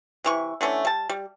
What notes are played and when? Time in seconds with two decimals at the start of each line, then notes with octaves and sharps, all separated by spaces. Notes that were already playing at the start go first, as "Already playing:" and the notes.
0.24 C3 E3 C#6
0.61 D3 E3 A3 C#4
0.85 G3 A5
1.09 G3